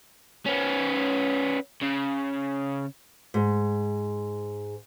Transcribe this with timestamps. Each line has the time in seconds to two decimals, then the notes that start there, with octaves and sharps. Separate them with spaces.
0.46 B3 C#4
1.82 C#3
3.34 G#2